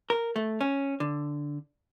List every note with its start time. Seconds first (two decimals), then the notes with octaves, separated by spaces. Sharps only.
0.10 A#4
0.36 A3
0.61 C#4
1.00 D3